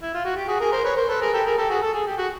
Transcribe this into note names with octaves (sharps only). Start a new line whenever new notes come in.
E4
F4
F#4
G4
F#4 G#4
G#4 A#4
A#4 C5
B4 C#5
A#4 C5
A4 B4
G#4 A#4
G4 A4
G#4 A#4
G4 A4
F#4 G#4
A4
G#4
G4
F#4 G#4